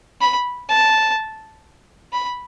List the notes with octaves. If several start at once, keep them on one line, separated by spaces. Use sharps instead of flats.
B5
A5
B5